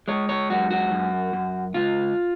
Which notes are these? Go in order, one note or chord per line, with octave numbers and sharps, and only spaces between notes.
G#3 C#5
C#5
F#2 F#4
F#4
F#2
F#2
C#2 F4